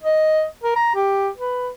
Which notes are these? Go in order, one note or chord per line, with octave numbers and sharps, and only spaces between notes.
D#5
A#4
A#5
G4
B4